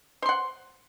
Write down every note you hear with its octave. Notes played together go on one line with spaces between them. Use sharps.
C5 F#5 C6